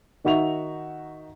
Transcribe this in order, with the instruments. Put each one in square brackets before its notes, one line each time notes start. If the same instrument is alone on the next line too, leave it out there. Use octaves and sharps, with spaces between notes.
[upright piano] D#3 D#4 F#4 E5 C#6 F7